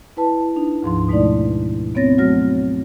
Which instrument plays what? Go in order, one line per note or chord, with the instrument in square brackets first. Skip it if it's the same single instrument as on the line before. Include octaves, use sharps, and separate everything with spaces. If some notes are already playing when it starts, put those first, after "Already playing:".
[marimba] E4 B4 A5
D4 D#4
D2 G#2 F3 C6
B2 G#3 A3 D#4 E4 D5
B3 C4 C#5 A6 A#6
F#3 A3 F#4 C#5 F6 A#6